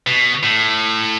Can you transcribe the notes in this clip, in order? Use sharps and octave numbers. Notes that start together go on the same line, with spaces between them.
B2
A2